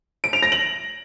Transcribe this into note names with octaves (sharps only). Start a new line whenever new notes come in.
D7
F7
A#6
F#7